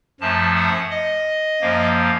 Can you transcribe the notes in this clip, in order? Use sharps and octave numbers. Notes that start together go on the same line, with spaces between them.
F#2 F3 A3 A5
F#5
D#5
F#2 F3 A#3